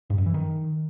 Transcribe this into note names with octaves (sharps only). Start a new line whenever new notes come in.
G2
F#2
E3
D#3